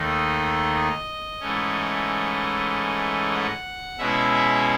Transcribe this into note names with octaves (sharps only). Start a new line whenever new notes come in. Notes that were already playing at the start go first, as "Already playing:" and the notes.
Already playing: D#2 D#3 A3 D#4
D#5
D#5
G#2 E3 A3 C#4
F#5
B2 G#3 C#4 E4 E5